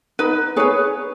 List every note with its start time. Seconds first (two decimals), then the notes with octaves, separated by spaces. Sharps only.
0.19 D#4 B4
0.56 G#4 B4 C#5